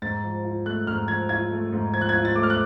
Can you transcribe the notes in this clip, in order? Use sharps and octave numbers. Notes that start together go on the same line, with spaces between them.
G#2 A6
F3
F4
A3 F#6
G#2 F6
F3 G#6
F4 G#6
A3
G#2
F3 G#6
F#6
G#6
F4
A6
A3 D6
F6
F#6